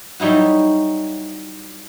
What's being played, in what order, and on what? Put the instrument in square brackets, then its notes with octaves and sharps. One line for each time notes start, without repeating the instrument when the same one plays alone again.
[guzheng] F#3 G3 D#4 E4 F#4